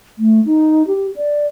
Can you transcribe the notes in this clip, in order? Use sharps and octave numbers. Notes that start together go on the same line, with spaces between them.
A3
D#4
G4
D5